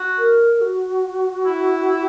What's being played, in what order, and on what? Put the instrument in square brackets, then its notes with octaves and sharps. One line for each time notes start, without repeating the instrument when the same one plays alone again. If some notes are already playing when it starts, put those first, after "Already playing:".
Already playing: [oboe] F#4
[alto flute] A#4
F#4
[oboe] E4